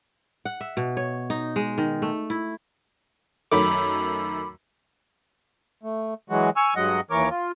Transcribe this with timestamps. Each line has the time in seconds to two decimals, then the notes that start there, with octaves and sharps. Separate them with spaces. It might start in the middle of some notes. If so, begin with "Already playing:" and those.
0.45 F#5
0.61 E5
0.77 B2
0.97 C#5
1.30 D#4
1.56 G#3
1.78 D#3
2.02 A3
2.30 E4
3.52 F#2 D#3 A3 B5 D6
5.83 A3
6.30 E3 F#3 G#3 F#4
6.56 G#5 C#6 E6 F6
6.76 G2 F#3 G#3 D#5 F#5
7.11 D#2 E3 A#4 C#5 D6
7.30 F4